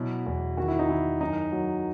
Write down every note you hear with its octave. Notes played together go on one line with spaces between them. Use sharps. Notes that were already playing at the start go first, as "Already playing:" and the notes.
Already playing: B2 F#3 E4
E2
D#3 F#4
E4
D#4
D#3 E4
F#2 D#4
F#3